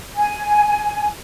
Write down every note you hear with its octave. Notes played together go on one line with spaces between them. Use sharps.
G#5